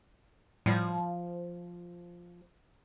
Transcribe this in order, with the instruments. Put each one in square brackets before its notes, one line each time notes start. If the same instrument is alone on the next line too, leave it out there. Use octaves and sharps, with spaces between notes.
[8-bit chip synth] A2 G3 [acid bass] F3